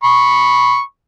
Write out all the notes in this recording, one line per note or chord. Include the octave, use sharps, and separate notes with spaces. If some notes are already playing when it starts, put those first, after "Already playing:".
B5 C#6